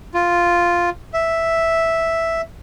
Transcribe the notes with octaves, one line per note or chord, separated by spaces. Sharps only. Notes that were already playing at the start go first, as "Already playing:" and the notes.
F4
E5